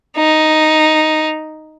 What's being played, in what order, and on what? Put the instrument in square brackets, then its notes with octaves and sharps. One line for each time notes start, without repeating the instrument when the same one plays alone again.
[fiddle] D#4